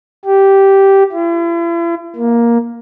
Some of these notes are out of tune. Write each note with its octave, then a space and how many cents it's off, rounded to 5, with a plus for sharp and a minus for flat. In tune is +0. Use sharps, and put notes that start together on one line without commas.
G4 -10
E4 +45
A#3 +10